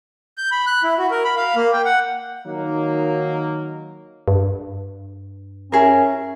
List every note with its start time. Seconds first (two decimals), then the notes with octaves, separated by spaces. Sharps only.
0.37 G6
0.51 B5
0.67 F#6
0.83 E4
0.98 F#4
1.11 A#4
1.24 B5
1.36 F5
1.56 A#3
1.72 G5
1.85 F#5
2.46 D#3 F#3 A#3 D#4
4.28 G2
5.72 C#4 E4 G#4 A#4